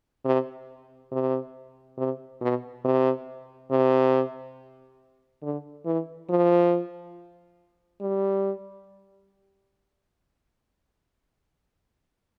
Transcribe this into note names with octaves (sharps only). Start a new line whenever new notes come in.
C3
C3
C3
B2
C3
C3
D3
E3
F3
G3